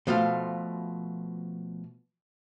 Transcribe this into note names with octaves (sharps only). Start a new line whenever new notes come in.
B2 F3 A3 F4 F5